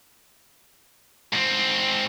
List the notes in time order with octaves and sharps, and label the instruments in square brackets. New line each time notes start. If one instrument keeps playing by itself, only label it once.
[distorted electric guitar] G#2 C4